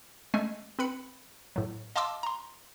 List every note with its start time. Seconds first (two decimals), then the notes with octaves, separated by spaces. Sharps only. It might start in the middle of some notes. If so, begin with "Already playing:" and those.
0.34 G#3 A3 C#4 G#5
0.79 C4 B4 B5 C#7
1.56 A2 F#3
1.96 D#5 F5 A5 C6 D6 E6
2.23 A#5 C6